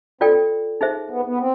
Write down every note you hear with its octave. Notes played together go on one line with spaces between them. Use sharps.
C4 F4 A4 D5 G5
D#4 G#4 C5 E5
B3
B3
C4